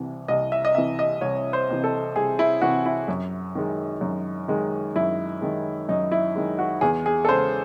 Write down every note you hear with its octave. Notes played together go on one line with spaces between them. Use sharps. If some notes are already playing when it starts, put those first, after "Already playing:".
Already playing: C2 C3 E3
C2 D#5
E5
D#5
C3 E3 E5
D#5
C2 C#5
C5
C3 E3
A4
C2 G#4
E4
C3 E3 F#4
E4
F#2
D#3 G#3
F#2
D#3 G#3
F#2 E4
D#3 G#3
F#2 D#4
E4
D#3 G#3
F#4
E2 G#4
G#4
A4
C#3 G#3 C5